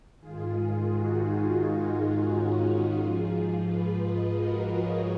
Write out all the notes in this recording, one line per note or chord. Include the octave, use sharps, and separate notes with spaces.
G#2 D#3 F4 G#4
D#4 F#4
F4 G#4
D#4 F#4
D#4 F#4
C#4 F4
D#4 F#4
G#2 F3 F4 G#4
G#4 B4
B4 D#5
F#4 A#4
A#4 C#5